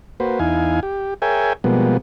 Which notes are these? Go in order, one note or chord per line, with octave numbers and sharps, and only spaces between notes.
A#3 F#4 B4 C5
E2 D#4 E4 F5 G#5
G4
G#4 A#4 C#5 E5 G5 G#5
B2 F3 G3 G#3 A#3 B3